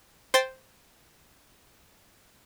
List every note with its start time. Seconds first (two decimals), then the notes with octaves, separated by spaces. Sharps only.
0.34 C5 G5 A6